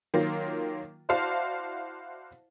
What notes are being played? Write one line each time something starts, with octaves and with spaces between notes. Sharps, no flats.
D#3 F#3 A#3 F4
E4 F#4 C5 D5 F5 A5